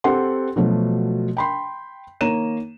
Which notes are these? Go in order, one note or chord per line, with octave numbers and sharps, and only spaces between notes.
C4 G4 A4 F#5 C6
B2 F3 F#3 A3
G5 B5 C6
D#3 A#3 C#5 A#5 D#7 E7